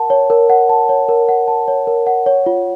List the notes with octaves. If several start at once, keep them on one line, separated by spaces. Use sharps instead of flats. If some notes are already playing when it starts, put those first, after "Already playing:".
Already playing: A#4 F#5 A5
C#5
A#4
F#5
A5
C#5
A#4
F#5
A5
C#5
A#4
F#5
C#5
F4